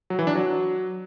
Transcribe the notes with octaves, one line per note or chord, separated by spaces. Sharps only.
F#3
E3
D4
F#3